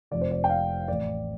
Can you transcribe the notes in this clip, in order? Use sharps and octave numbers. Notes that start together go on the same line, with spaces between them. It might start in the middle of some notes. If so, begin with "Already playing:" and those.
F1 F2 C3 D5
C5
D5
G5
F5
A1 A2 D5